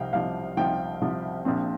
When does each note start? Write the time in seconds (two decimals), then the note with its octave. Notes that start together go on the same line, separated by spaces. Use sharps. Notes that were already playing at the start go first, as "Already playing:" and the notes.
Already playing: C2 C3 F3 F5 G5
0.13 C2 C3 F3 F5
0.57 C2 C3 F3 G5
1.02 C2 C3 F3
1.45 A#1 A#2 F3 C4